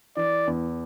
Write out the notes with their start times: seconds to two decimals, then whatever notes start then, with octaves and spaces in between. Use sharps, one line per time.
0.16 E3 D5
0.47 E2